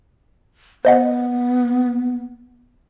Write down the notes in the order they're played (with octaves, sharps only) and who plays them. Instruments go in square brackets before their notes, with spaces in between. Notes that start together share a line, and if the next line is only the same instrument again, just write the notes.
[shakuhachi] B3 [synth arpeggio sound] C5 D#5 F#5